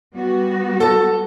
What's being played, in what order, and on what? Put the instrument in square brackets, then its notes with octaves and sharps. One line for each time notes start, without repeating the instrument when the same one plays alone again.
[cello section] G3 B3 F#4
[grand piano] A4 A5